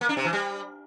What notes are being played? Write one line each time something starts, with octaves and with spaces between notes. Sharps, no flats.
A#3
D4
C3
E3
G3